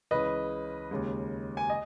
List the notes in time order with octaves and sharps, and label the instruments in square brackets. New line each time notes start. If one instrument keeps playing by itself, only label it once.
[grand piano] C#2 C#3 E3 B4 D#5
D#2 C#3 G#3
G#5
D#5